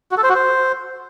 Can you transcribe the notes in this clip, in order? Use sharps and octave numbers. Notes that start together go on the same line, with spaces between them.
F#4
A4
C5
F#4
C5